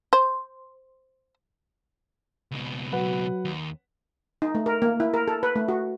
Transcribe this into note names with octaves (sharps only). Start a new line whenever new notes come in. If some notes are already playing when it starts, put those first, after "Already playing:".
C5
C#2 B2
F#3 B4 F#5
D#2
D#4
A3
A#4
A#3
E4
A#4
A4
B4
A3
F#4